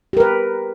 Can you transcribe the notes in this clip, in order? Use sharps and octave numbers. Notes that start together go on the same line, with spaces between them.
G4 A#4 B4